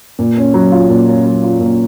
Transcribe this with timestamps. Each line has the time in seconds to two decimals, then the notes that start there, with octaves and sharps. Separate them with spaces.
0.19 A#2
0.37 C#4
0.54 F#3
0.72 F4
0.89 A#2
1.08 C#4
1.25 F#3
1.43 F4
1.60 A#2